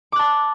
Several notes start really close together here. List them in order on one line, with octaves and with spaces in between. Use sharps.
D6 F#6 A5